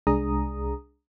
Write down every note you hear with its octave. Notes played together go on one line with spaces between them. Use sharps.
C2 G#3 D4 G#4 A#5 D#6